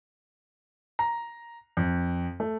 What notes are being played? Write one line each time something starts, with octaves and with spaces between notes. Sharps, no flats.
A#5
F2
A3